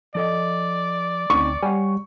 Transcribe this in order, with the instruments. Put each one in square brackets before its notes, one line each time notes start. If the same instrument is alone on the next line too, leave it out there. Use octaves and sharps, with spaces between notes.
[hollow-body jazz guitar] F3 A4 D#5 [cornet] D5
[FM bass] D2 [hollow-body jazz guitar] C4 C#4 D#4 [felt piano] C#6
[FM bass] G3 [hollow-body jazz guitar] C#5 F#5 G#5